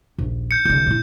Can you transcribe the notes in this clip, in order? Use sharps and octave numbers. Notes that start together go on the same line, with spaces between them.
A#1 D#2
G6 C#7
C2 D3 G6
A#2 E4